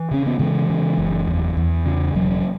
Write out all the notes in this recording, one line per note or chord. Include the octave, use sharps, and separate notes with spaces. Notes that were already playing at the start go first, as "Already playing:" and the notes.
Already playing: E3
C#3 C#4
B3
C#3 E3 G#3
C#3
F#1
E2
E2
C#3
E1 F#3